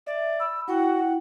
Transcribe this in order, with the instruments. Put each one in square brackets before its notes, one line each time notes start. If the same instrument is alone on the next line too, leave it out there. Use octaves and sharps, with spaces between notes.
[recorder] D5 [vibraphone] E5
[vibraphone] B5 [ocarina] E6
[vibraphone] E4 G5 [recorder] F#4 [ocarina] F#5